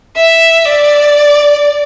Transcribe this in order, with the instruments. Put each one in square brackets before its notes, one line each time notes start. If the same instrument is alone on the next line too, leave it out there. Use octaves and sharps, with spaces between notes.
[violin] E5
D5